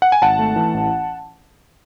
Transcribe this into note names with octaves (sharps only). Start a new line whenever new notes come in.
F#5
G#5
G#1 F#5 A5
A3
E3
A1